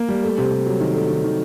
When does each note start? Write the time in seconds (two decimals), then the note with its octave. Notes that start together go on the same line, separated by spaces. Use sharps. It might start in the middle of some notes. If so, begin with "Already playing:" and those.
Already playing: A#3
0.09 G3
0.23 A3
0.38 C3
0.52 C3
0.66 F#3
0.80 D#3
0.95 A3
1.09 D#3
1.24 D#3